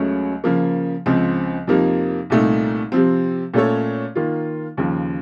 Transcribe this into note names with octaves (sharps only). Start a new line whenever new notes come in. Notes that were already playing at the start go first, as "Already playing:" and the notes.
Already playing: C#2 C#3 F#3 A3 C#4
C#3 F3 A#3
C#2 C#3 F3 C4
F2 C3 F3 A#3 D#4
C2 A#2 A3 D#4
C3 F3 C4
A#2 A3 C#4 A4 C#5
D#3 A#3 F4
D#2 C#3 F3